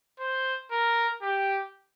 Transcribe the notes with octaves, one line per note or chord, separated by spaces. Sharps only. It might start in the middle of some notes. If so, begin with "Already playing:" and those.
C5
A#4
G4